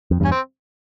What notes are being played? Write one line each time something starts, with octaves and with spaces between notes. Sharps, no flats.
F2
E2 G2 C#4
C4